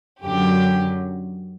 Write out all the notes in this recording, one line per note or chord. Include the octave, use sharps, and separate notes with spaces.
F#2 D3 F#3 G4